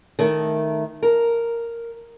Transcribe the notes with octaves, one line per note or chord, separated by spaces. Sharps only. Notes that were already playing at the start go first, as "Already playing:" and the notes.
D#3 A3
A#4